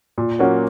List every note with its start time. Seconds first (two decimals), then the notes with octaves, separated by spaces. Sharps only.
0.18 A#2
0.39 F#3 A#3 C#4 F#4